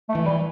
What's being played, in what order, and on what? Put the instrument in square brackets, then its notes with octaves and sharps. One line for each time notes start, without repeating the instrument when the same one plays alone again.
[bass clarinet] A3
[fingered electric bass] E3
[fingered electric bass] E3 [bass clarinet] G3